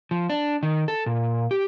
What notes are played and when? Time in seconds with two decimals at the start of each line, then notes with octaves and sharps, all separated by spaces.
0.11 F3
0.30 D4
0.63 D#3
0.88 A4
1.06 A#2
1.51 G4